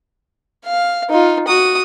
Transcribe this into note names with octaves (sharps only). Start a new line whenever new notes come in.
F5
D#4 F4
F#4 D#6